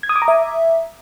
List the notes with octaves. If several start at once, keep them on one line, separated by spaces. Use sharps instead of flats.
G#6
D#6
D6
A#5
E5